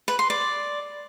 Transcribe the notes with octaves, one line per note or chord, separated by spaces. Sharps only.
B4
C6
D5